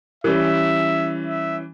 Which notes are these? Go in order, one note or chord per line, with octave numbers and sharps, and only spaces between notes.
E3 G3 C#4 E5
E5